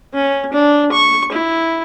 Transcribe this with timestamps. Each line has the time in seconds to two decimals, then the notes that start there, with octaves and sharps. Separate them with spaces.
0.14 C#4
0.53 D4
0.92 C#6
1.32 E4